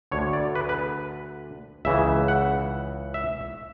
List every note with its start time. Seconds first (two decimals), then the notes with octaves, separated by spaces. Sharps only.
0.12 D2 D3 C#5
0.33 D5
0.55 B4
0.69 B4
1.85 C#2 C#3 E3 E5
2.28 F#5
3.14 E5